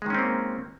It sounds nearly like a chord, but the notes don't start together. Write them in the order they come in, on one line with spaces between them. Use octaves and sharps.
G#3 D#3 C#4 C4 A#3